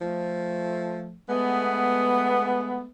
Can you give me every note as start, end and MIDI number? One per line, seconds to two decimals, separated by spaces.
0.02 1.16 53
0.02 1.16 57
1.29 2.87 56
1.29 2.87 57
1.29 2.87 59